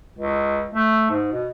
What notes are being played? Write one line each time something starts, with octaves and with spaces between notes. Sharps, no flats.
C#2
A3
G#2
B2